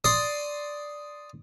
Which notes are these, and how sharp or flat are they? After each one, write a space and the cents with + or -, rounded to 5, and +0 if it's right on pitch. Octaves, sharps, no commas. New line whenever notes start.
D5 +0 C6 +0 D#6 +0